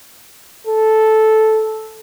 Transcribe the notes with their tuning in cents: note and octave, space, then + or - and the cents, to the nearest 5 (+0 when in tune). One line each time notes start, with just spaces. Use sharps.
A4 -10